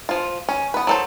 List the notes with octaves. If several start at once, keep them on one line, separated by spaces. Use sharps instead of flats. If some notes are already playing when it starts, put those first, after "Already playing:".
F3 F4
C#4
B3 B4
F#3 A4 C5